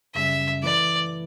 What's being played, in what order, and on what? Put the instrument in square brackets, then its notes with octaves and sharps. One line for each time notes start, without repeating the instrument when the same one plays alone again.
[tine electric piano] F#2 C#3 G3 C#4 [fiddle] E5
[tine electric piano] E3 A3 E4 B4 [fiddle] D5